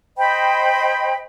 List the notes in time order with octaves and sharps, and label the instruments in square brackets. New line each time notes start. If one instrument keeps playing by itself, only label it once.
[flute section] C5 D#5 G5 B5